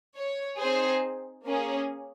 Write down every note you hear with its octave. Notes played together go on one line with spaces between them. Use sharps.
C#5
C4 D#4 G#4 C5
A#3 C#4 G#4